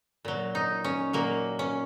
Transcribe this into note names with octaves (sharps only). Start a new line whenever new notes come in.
A#2 F#3
D#4
C#4
A#2 F#3 A#3
C#4